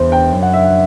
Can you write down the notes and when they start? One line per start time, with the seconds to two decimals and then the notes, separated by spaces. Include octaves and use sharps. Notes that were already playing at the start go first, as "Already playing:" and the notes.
Already playing: E2 C5
0.12 G5
0.32 F#2
0.42 F#5
0.53 E5
0.64 F#5